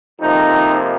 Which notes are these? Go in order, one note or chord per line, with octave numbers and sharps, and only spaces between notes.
F2 C3 F3 A#3 D#4